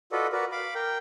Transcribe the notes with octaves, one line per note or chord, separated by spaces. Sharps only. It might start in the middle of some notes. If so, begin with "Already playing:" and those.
F4 F#4 A4 B4 D5 D#5
F#4 A#4 B4 D5
F5 B5 D6
A#4 G5